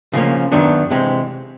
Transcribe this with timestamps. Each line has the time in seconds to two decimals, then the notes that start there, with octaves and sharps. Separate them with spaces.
0.13 C#3 F3 A#3 C#4
0.52 F#2 D#3 F#3 B3 D4
0.91 C3 E3 G#3 C4